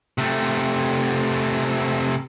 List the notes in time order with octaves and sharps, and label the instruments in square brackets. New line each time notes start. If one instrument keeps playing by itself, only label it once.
[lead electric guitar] C3 A3